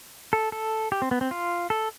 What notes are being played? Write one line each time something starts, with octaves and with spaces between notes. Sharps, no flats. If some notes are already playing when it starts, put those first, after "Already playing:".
A4
A4
G4
C4
B3
C4
F4
A4